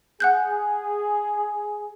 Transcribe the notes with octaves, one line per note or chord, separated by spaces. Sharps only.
G#4 F#5 F#6 G6